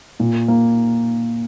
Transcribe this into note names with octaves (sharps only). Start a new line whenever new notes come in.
A#2
A#3